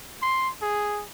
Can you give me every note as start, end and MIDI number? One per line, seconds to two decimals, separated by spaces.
0.22 0.50 84
0.62 1.04 68